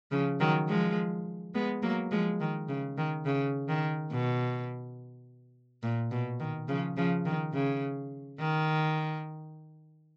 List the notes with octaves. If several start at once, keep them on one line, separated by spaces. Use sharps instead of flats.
C#3 F3
D#3 F#3
F3 G#3
G#3 B3
F#3 A#3
F3 G#3
D#3
C#3
D#3
C#3
D#3
B2
A#2
B2
D#3
C#3 F3
C#3 F3
D#3
C#3
D#3